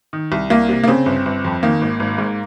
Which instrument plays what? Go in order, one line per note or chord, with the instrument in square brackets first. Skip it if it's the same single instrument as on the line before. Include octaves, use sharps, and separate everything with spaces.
[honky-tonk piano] D#3
C2
C2 A#3
C3
A#3
C#3 C4
G1
G1
F2
D#3 A#3
G#1
G#1
G#2